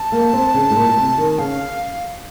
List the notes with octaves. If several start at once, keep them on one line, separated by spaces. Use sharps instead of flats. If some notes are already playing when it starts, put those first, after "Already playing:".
Already playing: A5
A#3
C4
C#3
A2
A#2
A#2
C3
D#3
C#3 F5